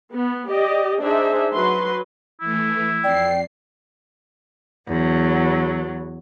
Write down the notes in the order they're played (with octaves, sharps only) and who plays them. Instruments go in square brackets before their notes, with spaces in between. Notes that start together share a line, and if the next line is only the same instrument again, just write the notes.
[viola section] B3
G4 D5 D#5
D4 D#4 G#4 C5 E5
F#3 F#4 B4 C6
[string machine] E3 A3 [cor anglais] E4
[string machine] F2 C7 [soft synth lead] D5 [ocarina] G5
[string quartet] E2 F#3